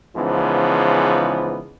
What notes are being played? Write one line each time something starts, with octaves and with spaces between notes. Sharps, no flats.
G#2 C#3 E3 F3 B3